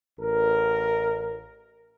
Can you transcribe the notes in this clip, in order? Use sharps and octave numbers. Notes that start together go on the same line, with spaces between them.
A1 A#4